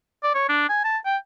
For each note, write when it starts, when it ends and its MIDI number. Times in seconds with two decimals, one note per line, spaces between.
0.23 0.34 74
0.35 0.48 73
0.49 0.68 62
0.69 0.82 80
0.84 0.98 81
1.05 1.17 79